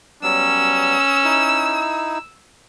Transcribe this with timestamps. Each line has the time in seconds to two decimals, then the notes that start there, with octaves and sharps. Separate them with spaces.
0.23 F#3 G3 B3 C#4 E6
1.24 D#4 E4